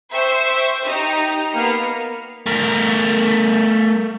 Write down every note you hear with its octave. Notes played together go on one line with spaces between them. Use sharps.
C5 E5 G5 C#6 E6
D#4 G4 A#5
A#3 B3 B4 F6 C7 C#7
A3 A#4